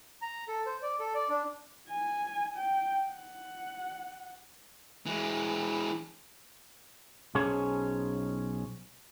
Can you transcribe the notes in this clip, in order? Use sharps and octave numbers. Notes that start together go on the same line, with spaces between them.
A#5
A4
C5
D5
A4
D5
D4
G#5
G5
F#5
E3 G#3
B1 C#4 G#4 C5 C#5